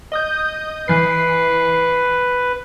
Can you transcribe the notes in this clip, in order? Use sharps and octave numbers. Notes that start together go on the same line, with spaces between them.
D#5 D#6 G6
E3 B4 C7